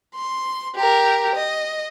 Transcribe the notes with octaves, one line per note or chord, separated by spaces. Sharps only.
C6
G4 A#4
D#5